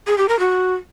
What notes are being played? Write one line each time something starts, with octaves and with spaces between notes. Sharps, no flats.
G#4
G4
A#4
F#4